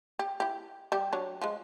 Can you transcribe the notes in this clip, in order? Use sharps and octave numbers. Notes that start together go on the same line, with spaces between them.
G4
E4 G4
G3 G4
F#3 D4 C#5
F3 G#3